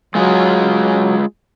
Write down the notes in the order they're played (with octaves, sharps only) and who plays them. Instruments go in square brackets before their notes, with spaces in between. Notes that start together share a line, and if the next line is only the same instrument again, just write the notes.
[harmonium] F#3 [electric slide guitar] G#3 F4 G#4